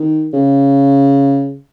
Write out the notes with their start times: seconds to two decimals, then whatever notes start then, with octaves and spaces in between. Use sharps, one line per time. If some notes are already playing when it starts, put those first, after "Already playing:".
Already playing: D#3
0.33 C#3